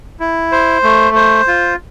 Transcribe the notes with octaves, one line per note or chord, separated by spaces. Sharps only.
E4
C5
A3
C5
F4